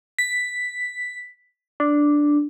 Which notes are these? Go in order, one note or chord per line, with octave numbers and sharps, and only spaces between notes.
B6
D4